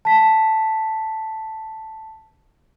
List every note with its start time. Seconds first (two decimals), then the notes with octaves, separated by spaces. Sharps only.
0.05 A5 B6